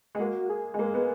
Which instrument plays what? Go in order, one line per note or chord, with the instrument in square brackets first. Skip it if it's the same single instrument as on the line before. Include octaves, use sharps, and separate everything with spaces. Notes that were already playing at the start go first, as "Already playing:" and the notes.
[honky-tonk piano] G#3
[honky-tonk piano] A#3 [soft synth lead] F#4
[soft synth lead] G#4
[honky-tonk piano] G#3
A#3
B3